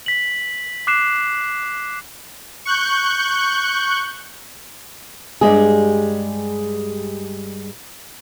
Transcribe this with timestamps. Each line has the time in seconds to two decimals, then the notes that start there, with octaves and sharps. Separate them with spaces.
0.06 B6 F#7
0.87 D6 F#6 C7 E7
2.65 C#6 F#6 G6
5.41 G2 G3 G#3 G#4